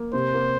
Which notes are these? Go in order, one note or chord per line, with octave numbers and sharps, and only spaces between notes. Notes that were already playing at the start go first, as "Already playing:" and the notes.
Already playing: A#3
C3 C5
A#3